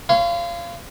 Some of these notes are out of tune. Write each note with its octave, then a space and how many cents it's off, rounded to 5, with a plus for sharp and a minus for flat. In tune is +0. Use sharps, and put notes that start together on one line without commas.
C#5 +0 F5 -25 C6 -40